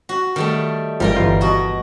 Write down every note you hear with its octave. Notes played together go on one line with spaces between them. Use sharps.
F#4
D#3 G3 A3
G#1 F3 G3 A#4 G5
G1 E3 F4
B2 F#4 D#5